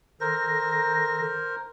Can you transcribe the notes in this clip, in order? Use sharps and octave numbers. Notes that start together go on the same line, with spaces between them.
D#3 A4 A#4 C5 A#6